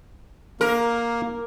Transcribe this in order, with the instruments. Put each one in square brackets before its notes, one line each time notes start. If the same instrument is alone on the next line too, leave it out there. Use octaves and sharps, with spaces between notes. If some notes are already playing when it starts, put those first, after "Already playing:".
[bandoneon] A#3 [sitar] A#4